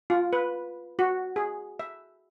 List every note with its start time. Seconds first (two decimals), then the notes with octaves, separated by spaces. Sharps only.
0.10 F4
0.33 B4
0.99 F#4
1.36 G#4
1.79 E5